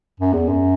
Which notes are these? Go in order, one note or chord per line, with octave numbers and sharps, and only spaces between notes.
F#2
E2
F#2